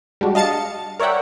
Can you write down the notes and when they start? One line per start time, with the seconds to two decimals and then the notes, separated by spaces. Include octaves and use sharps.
0.21 G3 G#3 D4 F#4
0.35 D#5 F5 A5 A6 C#7
0.99 A#4 C#5 D5 E5 F#5 G5